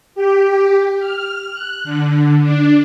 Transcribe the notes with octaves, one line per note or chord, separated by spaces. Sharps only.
G4
F6
F#6
D3
D4